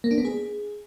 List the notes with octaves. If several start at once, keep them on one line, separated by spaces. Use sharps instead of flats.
A#3
D4
B3
G#4